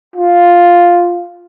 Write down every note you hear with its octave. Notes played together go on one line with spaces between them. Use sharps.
F4